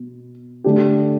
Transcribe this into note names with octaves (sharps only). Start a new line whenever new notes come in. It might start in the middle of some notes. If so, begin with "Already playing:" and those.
Already playing: B2
D3 A3 D4 G4